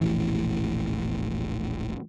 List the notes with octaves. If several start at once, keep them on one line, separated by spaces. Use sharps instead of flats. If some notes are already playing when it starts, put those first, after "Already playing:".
E1 A#1 A2 E3